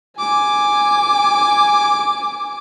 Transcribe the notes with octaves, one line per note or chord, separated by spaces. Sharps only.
G#5 D6